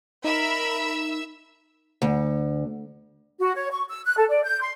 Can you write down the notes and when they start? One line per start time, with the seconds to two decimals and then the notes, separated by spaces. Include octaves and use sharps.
0.24 D#4 A#4 E5 B5 E6
2.02 D2
3.40 F#4
3.55 C#5
3.71 C#6
3.89 E6
4.06 F#6
4.17 A4
4.29 D5
4.43 G6
4.61 C6